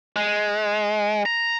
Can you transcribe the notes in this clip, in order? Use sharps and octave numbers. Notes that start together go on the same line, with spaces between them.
G#3
A#5